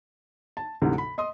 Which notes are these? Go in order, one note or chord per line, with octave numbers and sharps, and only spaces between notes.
A5
D2 G#2 C3 E3
B5
D#5 C6 D#6